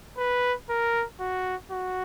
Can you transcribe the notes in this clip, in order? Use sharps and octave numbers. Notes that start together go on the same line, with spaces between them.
B4
A#4
F#4
F#4